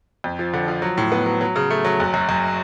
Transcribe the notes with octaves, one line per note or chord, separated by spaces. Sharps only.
F2
F3
D3
F3
F#3
A2
B3
F#3
F#3
C#3
A3
F#3
F#1
F#2
F#2